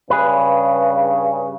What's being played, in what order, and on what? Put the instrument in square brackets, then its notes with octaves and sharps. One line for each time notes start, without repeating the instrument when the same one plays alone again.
[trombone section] G2 C#3 [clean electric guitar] G#4 B4